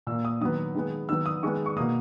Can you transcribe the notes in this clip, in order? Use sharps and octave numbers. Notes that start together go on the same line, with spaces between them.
A#2 A#3 E6
D#6
D#3 F#3 B3 D#6
D#3 G#3 B3
D#3 F#3 B3 E6
D#6
D#3 G#3 B3 C#6
C#6
B2 A#3 D#6